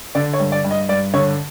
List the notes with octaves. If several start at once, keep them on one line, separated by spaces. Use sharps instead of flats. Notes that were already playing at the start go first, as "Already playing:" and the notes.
D3 D5
C#5
G2
D5
G2
D#5
G2 D5
D3 C#5